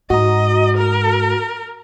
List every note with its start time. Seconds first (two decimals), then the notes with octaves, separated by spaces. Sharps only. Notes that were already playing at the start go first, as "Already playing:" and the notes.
0.10 G#2 F#4 D#5 A#5
0.77 A#4